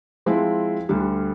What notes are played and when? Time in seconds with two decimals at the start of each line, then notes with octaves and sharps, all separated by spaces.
0.26 F3 G#3 C4 E4
0.89 D2 D3 G3